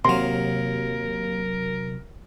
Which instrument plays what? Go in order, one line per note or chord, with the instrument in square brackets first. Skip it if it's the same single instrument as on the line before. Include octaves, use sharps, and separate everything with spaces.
[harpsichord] D#2 F5 [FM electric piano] C3 F#3 [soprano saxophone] A#4 [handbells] C6